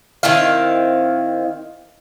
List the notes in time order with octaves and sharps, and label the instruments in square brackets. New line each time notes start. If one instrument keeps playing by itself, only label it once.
[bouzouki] D#3 C4 E4 F5